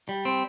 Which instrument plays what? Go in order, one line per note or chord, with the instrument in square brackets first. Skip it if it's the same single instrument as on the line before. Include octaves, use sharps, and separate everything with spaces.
[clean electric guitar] G3
C4